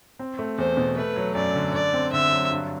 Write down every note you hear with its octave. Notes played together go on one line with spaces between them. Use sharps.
C4
A3
E2 C5
B2
A3 B4
F#3
F#2 D5
D3
D3 D5
C4
D3 E5
F#3
G2